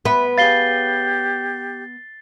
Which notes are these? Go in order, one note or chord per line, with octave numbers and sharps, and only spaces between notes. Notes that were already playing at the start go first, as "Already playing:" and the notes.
B3 B4 E5
G4 G#4 C#5 F5 A6 C7 G7